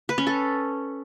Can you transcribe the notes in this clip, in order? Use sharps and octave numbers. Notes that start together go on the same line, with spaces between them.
B4
C#4
A4